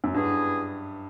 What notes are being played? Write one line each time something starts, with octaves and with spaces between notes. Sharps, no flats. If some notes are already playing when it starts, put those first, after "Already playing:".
F#2
G2 B3 E4 G#4